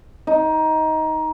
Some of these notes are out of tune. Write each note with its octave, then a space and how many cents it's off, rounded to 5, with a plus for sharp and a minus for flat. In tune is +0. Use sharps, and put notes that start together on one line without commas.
D#4 +15